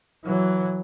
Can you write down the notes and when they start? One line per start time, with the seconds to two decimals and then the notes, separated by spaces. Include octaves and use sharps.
0.25 E3 F#3